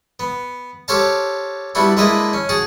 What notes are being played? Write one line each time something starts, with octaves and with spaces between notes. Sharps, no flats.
B3
G4 A4 C5 C#5 F5 A5
G3 B3 D4 E4 F#4
G#3 A#3 D4 E4 B4 D#5
C#4
F#4 G#4 A5